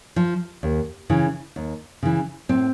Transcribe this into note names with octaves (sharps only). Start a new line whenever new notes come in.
F3
D#2
C#3 E3
D#2
C#3 E3
A2 C4